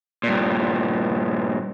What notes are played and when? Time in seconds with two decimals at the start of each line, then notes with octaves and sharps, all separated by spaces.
0.23 G2 A#2